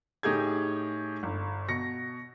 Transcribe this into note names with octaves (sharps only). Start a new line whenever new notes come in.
A2 D#4 G4 G#4 G#6
G1
B2 A#6 C#7